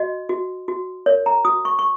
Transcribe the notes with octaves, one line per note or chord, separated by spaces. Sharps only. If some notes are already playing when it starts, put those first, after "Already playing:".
Already playing: F#4 D#5
F#4
F#4
A#4 C#5
A#5
F#4 D#6
C#6
C#6